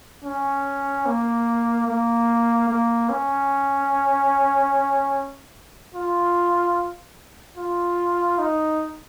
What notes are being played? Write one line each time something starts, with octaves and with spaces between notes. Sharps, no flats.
C#4
A#3
A#3
A#3
C#4
F4
F4
D#4